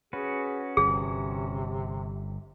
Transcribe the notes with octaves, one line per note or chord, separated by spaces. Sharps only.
C#4 F#4 G#4 B4
G1 C3 G#4